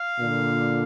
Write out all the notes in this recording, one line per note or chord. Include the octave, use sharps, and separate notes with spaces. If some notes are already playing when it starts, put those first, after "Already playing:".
Already playing: F5
A#2 D3